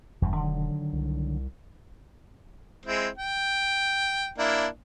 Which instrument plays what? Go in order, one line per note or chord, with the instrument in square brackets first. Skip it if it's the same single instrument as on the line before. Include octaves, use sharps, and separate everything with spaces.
[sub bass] E1 [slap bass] E2 G2
[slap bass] D3 D#3 F#3
[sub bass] C2
[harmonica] G#3 C4 E4
G5
A#3 D4 E4